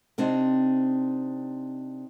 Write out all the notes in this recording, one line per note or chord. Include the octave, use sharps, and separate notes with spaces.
C3 C4 D4 D#4